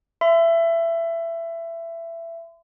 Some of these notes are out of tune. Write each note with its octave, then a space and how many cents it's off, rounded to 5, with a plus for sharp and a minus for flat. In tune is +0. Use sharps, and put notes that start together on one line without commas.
E5 +20 C6 -40